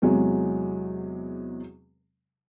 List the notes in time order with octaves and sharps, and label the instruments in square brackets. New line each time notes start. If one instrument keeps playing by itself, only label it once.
[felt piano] E2 C3 F#3 G#3